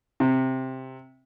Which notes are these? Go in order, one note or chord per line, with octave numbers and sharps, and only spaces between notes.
C3